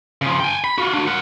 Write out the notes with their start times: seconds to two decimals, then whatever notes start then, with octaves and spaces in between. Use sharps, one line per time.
0.22 C#3 F3
0.40 G5 G#5
0.64 B5
0.78 F4 F#4
0.94 D4 F#4
1.07 A#4 F#5